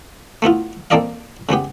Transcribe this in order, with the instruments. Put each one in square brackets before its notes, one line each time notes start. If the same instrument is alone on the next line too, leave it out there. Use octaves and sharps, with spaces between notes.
[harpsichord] A3 B3 E4 F4
A#3 C4 A4 D5 D#5 F5
C#3 G#3 B3 G4